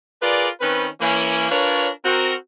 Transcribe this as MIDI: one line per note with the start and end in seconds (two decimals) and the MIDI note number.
0.22 0.49 65
0.22 0.49 68
0.22 0.49 70
0.22 0.49 71
0.22 0.49 74
0.61 0.87 51
0.61 0.87 60
0.61 0.87 61
0.61 0.87 71
1.01 1.50 52
1.01 1.50 58
1.01 1.50 61
1.51 1.89 62
1.51 1.89 65
1.51 1.89 70
1.51 1.89 71
1.51 1.89 73
2.05 2.34 60
2.05 2.34 66
2.05 2.34 70